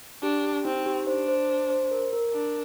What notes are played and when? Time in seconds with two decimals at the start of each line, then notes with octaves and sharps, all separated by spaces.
0.23 D4 G4
0.44 G4
0.65 C4 D#4
0.86 G4
1.07 D4 C5
1.28 C5
1.49 C5
1.70 C5
1.91 A#4
2.13 A#4
2.33 D4 A#4